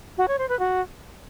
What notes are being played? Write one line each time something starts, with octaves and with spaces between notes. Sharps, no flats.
F#4
C#5
C5
B4
F#4